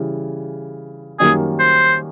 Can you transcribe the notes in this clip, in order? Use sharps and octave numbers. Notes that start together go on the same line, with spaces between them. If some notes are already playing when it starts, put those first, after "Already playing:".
Already playing: C#3 E3 G3
F#2 D#3 G3 A#3 G#4
C5